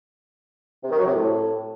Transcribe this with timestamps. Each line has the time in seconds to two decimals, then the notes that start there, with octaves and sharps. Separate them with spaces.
0.83 C3
0.91 D#3
0.99 F#3
1.06 C3
1.14 A2